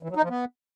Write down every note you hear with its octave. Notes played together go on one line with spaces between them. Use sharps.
E3
F#3
D#4
F3
B3